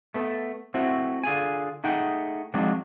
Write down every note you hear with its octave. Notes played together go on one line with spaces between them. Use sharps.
A3 B3 A4
A3 C4 E4 F#4
D3 F4 G#4 G#5
A3 D#4 G#4 F#5 G5
F3 F#3 G#3 C4 D4 D#4